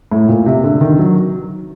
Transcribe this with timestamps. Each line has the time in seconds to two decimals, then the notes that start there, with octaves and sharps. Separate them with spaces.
0.12 A2
0.29 A#2
0.46 C3
0.64 D3
0.81 D#3
0.99 F#3